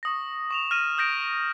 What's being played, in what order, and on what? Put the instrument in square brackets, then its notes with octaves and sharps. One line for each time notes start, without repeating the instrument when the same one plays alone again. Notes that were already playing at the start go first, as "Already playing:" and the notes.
[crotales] C#6 D#6 A#6
C#6 E7 F7
F6 A#6 D#7 E7
D#6 G6 A#6 D7